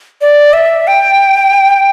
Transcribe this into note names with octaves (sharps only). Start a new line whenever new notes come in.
D5
E5
G5